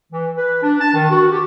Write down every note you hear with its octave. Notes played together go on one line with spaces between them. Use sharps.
E3
B4
D4
A5
D#3
F#4
G4